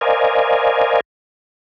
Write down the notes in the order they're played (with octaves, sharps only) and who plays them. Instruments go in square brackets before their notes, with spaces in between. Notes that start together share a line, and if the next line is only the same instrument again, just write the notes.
[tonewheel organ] A#4 C5 D5 D#5 F5 G#5